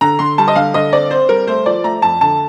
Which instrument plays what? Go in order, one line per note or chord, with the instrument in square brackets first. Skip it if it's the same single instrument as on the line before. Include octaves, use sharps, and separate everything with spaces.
[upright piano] D3 A#5
D3 C6
G3 A5
D#5
D3 F5
D3 D#5
C4 D5
C4 C5
G3 A#4
A3 C5
F3 D5
A3 A#5
F2 A5
D3 A5